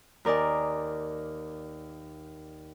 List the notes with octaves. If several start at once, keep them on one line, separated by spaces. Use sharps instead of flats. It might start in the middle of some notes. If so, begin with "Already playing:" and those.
D#2 A#4 D5 D#5 G#5